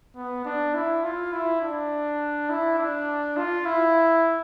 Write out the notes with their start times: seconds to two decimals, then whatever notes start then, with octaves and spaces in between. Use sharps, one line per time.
0.16 B3
0.45 D4
0.74 E4
1.03 F4
1.32 E4
1.62 D4
2.50 E4
2.78 D4
3.37 F4
3.65 E4